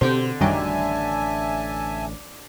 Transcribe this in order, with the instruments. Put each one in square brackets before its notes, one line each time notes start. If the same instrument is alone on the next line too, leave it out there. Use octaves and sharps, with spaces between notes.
[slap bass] B2 [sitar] D3 [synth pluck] C4 G4 C5
[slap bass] A1 D4 [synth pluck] F#2 D#3 G3 [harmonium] E5 G#5 A5